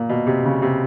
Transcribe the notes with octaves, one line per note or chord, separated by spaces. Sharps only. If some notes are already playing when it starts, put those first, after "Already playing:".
Already playing: A#2
B2
C3
C#3
C3